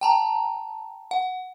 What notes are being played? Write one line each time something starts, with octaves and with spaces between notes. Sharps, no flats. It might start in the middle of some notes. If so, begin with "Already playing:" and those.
G5 A5 A#5
F#5